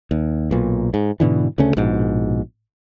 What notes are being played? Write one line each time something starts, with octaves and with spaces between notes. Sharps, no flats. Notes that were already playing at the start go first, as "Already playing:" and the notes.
D#2
B1 A#2
G#2
G#2 B2 D3 E3
D2 C#3 A3 C#4
A#1 G#2 B2